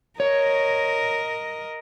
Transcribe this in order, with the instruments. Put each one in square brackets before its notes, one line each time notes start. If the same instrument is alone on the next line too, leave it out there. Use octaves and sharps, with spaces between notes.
[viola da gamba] A#4 D#5 [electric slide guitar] C#5